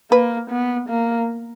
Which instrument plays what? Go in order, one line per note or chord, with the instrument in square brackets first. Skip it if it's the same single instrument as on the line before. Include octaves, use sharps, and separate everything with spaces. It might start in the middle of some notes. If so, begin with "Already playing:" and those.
[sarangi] A#3 [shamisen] B4
[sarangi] B3
A#3